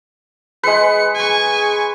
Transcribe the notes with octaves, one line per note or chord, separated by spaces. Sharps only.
G#3 G#4 B4 C#7
G#5 C#6